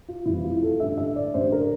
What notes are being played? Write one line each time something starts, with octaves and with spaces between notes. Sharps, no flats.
F4
F1 F2 E3 G3 E4
F4
A4
A1 G2 D3 E5
E5
D5
A1 G2 D3 C5
A#4